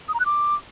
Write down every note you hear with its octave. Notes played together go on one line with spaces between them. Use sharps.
D#6
A#5
F#6
D6